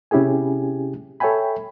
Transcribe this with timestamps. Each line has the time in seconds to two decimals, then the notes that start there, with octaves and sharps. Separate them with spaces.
0.11 C3 C#4 E4 G4 G#4 G#5
1.20 A4 C#5 E5 G5 G#5 B5